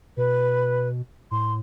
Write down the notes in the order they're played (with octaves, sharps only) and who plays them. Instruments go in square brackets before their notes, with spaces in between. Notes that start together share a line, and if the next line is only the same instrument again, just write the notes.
[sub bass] B2 [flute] B4
[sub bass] A2 [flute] C6